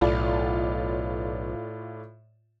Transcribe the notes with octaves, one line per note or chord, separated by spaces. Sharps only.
B1 A2 F4 D5